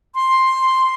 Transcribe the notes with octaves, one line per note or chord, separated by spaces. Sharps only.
C6